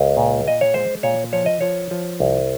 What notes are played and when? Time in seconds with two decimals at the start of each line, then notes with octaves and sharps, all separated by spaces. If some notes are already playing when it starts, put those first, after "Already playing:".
Already playing: C#2 A#4
0.17 A#2
0.45 A#2 D#5
0.61 C#5
0.74 G#3 C5
1.03 A#2 C#5
1.33 F3 C#5
1.46 D#5
1.61 F3 C#5
1.91 F3
2.20 C2